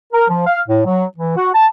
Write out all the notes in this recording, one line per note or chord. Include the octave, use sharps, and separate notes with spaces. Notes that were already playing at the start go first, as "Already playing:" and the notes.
A#4
F3
F5
A2
F#3
E3
F#4
A5